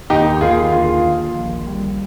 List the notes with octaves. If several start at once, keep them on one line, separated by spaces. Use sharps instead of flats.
D#2 D#4 G4
D#2 F4 G#4
D3 F4 G#4
D#2
A#1
G3